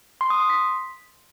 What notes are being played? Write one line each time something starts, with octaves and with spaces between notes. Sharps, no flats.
C6
D#6
C6
B6